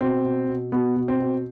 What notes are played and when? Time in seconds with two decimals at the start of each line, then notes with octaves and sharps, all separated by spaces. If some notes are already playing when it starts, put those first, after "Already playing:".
0.01 B2 C4
0.24 B2
0.48 B2
0.72 B2 B3
0.96 B2
1.08 C4
1.20 B2